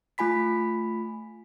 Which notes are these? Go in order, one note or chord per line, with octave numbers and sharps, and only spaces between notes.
A3 F4 G#5 B5 B6